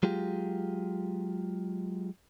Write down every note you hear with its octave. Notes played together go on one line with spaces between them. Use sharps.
F#3 G#3 F4 G4